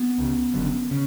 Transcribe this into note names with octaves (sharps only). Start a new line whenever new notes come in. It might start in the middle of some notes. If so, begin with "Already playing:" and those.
Already playing: B3
C#2 C#3
F#1 F#2 D3
C#3